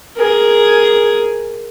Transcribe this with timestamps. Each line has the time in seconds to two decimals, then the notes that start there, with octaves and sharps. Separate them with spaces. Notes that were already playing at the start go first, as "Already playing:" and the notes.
0.17 G#4 A#4